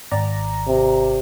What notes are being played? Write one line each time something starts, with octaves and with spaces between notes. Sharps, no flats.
G#1 D5 A#5
C3